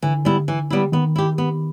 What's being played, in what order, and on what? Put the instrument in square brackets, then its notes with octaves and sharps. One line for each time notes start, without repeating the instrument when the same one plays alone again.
[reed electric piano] D3 [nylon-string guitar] E3
[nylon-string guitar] G3 B3 E4
E3
G3 B3 E4
[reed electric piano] D#3 [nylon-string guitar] B3
[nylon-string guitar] E4 G4
B3